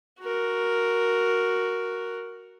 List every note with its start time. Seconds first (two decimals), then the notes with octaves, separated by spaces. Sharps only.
0.20 F#4 A#4